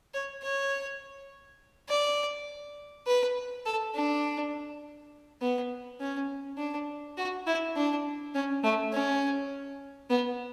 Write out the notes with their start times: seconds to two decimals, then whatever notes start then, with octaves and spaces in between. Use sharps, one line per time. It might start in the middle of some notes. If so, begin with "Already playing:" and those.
0.14 C#5
0.42 C#5
1.89 D5
3.07 B4
3.65 A4
3.94 D4
5.41 B3
6.00 C#4
6.58 D4
7.17 F#4
7.47 E4
7.76 D4
8.34 C#4
8.63 A3
8.93 C#4
10.10 B3